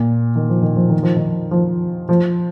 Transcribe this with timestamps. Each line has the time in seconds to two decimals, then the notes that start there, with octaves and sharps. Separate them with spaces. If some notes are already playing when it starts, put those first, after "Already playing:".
Already playing: A#2
0.36 D#3
0.49 F3
0.62 D#3
0.76 F3
0.90 D#3
1.03 F3
1.16 D#3
1.51 F3
2.09 F3